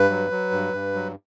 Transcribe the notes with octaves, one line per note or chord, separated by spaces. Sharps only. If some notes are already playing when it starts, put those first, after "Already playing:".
Already playing: G2 B4
F#3
F#3
G2
G2
F#3